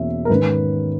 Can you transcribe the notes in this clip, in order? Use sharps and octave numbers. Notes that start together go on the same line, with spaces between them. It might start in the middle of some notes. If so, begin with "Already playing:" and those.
Already playing: E2 B2 A#3 C#4 E5
A#4
G#2 D#3 G#3 C#4 B4